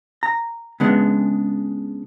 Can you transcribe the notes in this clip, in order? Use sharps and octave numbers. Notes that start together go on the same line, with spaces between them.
A#5
C#3 G#3 B3 D4